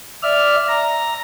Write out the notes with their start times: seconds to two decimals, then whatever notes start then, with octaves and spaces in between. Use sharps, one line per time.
0.23 D5 E5 F6
0.68 A#5